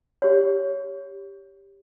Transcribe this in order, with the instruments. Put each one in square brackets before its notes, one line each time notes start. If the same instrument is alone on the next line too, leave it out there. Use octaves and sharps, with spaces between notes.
[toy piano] G4 C#5